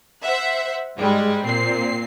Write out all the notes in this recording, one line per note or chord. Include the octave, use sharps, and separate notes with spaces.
C5 E5 F#5
G#2 G3 G#3
A#2 C4 C7